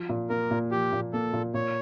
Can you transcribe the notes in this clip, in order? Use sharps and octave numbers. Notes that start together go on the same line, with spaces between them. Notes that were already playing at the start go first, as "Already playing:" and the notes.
Already playing: F3
A#2
A#3 A#4
A#2
F3 G4
A#2
A#3 A4
A#2
A#2 C#5